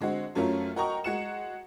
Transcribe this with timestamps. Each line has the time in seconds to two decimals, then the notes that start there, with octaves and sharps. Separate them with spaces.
0.01 D3 G#3 C4 F#4
0.35 F#2 F#3 A3 C#4 F4 A#4
0.76 F#4 A#4 D#5 G5 A#5 C#6
1.04 G#3 F#4 F#5 C#7 E7